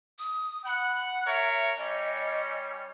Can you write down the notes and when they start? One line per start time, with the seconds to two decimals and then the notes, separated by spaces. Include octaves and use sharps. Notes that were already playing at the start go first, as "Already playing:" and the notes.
0.19 D#6
0.65 F#5 B5
1.27 A#4 C#5 E5
1.78 G3 C#4 C#5 D#5